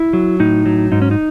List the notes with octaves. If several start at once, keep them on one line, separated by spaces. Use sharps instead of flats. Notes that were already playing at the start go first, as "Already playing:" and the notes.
Already playing: E4
F#3
A2 D#4
F#3
G#2 D#4
C#4
D#4